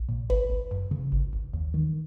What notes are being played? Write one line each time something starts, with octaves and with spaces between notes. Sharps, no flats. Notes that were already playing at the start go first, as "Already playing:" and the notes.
Already playing: A#1
A#2
G#1 B4
G#1
F#2
C#3
G#1
G#1
D#2
D#3